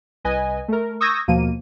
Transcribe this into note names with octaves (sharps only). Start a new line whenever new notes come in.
C2 B4 D#5 G#5
A3 A#4
C#6 D#6 E6 G6 G#6 A#6
D#2 B2 F3 A#3 D#7